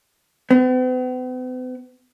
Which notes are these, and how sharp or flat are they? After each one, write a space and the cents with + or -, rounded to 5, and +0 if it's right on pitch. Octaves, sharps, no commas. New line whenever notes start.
B3 +45